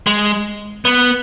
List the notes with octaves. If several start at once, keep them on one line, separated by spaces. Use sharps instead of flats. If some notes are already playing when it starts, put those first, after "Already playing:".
G#3
B3